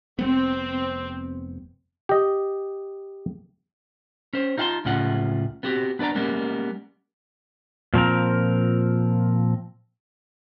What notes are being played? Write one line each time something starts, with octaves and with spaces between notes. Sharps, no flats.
F1 G3 B3 C4
G4 D#5
C#4 C5
D#4 F4 F5 F#5 A5 C6
C#2 A2 C#4 F4 F#5
B3 C4 F#4 G4
B3 D4 B4 D5 A#5
G3 G#3 A#3 B3 C#4
A#2 F3 C4 A#4